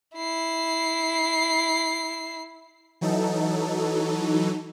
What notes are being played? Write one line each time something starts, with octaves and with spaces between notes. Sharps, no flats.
E4 C7
E3 F#3 D#4 A4